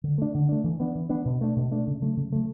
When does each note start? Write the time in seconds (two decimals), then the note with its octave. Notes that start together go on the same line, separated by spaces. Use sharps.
0.04 D3
0.18 A3 D4
0.34 D3
0.49 A3 D4
0.64 E3
0.80 B3 D4
0.95 E3
1.09 B3 D4
1.25 B2
1.41 A3 D4
1.56 B2
1.71 A3 D4
1.87 C#3
2.02 F#3 A3
2.17 C#3
2.32 F#3 A3